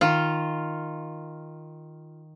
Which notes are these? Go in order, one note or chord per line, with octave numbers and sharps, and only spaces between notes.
D#3 F4